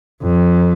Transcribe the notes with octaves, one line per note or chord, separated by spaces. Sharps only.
F2